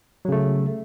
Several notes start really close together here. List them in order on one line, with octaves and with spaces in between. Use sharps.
F#3 C#3 A3